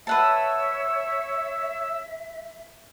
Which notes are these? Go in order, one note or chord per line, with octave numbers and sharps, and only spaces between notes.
B4 C#5 E5 F#5 A5 E6